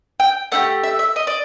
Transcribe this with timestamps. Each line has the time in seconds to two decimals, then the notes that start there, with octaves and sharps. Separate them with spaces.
0.20 G5
0.52 A3 D4 G4 F#5
0.83 E5
0.99 E5
1.16 D#5
1.27 D5